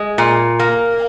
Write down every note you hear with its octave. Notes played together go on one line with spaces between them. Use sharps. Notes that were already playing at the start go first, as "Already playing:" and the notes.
Already playing: G#3
A#2
A#3